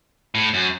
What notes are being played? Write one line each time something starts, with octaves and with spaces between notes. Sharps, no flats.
A2
F#2